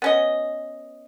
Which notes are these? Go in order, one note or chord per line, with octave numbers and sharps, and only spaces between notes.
B3 C#4 D#5